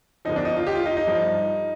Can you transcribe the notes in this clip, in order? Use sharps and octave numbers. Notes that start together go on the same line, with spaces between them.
D#2 D3 F3 D#4
D4
D#4
F4
G4
F4
D#4
D#4
G2 F3